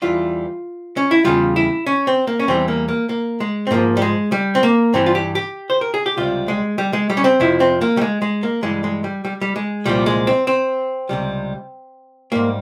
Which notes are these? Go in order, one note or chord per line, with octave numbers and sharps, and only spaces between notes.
E2 E3 G3 F4
C#4
E4
E2 C#3 G3 F4
E4
C#4
C4
A#3
C#4
E2 E3 G3 C4
A#3
A#3
A#3
G#3
C4
G#2 F3 A#3
G3
G#3
G3
C4
A#3
G2 E3 G3 C4
F4
G4
G4
C5
A#4
G#4
G4
C#2 C3 G3 F4
G#3
G3
G#3
G3
C#4
C4
F2 C3 F3 E4
C4
A#3
G3
G#3
G#3
A#3
G2 E3 G3 G#3
G#3
G3
G3
G3
G#3
C2 A#2 F3 G3
G#3
C4
C4
C#2 C3 G3
G#2 G3 A#3